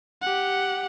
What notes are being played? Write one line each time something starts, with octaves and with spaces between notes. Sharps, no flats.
G4 F#5